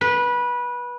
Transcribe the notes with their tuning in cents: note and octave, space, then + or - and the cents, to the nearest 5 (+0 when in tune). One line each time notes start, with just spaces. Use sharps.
B4 -20